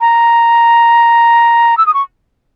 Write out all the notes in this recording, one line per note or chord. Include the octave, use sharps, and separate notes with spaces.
A#5
E6
D#6
C#6